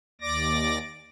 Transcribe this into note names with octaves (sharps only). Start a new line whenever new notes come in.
D#2 D5 D6 A#6